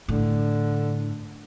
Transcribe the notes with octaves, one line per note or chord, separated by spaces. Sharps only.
A2 D3